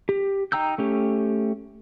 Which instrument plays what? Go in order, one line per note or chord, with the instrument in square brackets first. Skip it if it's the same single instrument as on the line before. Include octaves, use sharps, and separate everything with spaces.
[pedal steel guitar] G4
D#4 G5 A#5 E6 G6
A3 C#4 G4